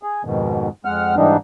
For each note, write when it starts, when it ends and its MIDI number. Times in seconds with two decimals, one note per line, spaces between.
0.03 0.22 68
0.25 0.68 41
0.25 0.68 44
0.25 0.68 47
0.25 0.68 51
0.85 1.15 41
0.85 1.15 56
0.85 1.15 78
0.85 1.15 89
1.16 1.37 44
1.16 1.37 51
1.16 1.37 52
1.16 1.37 55
1.16 1.37 62
1.16 1.37 63